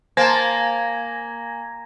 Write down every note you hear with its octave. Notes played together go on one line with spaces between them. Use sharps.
A#3 C5 G#5 A5 G#6 A#6